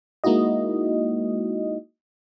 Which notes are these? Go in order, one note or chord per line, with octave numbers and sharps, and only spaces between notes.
G#3 A#3 D#4 E4 F#4 D#5